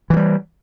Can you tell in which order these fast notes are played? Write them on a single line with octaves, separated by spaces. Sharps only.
E3 F3 G3